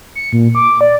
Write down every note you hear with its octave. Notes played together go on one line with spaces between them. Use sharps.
C#7
A#2
D6
D5